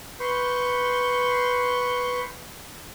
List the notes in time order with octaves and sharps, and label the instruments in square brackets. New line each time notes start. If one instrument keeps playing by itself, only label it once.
[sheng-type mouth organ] B4 C6 C#6 G6